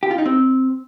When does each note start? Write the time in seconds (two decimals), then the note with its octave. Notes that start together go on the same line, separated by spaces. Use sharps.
0.03 G4
0.11 F4
0.18 D#4
0.26 C4